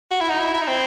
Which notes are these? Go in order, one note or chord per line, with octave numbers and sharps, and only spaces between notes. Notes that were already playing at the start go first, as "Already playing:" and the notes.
F#4
E4
D#4
E4
E4
D#4
C4